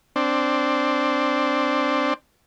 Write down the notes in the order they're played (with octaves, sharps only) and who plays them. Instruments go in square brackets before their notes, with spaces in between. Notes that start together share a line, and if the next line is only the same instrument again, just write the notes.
[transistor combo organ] C4 D4